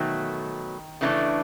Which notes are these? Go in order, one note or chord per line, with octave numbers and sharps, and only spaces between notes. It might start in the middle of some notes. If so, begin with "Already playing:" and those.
Already playing: B2 D#3 F#3 A3
C#3 E3 A3 D4